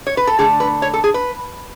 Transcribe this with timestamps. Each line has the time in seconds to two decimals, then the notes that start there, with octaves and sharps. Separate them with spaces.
0.07 C#5
0.17 B4
0.27 A4
0.39 D3 A3 G#4
0.60 B4
0.82 C#5
0.94 A4
1.04 G#4
1.14 B4